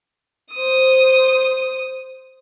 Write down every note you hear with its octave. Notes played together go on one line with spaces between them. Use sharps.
C5 D#6